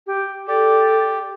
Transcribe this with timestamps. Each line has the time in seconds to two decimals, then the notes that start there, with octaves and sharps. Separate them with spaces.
0.07 G4
0.48 G4 A4 D5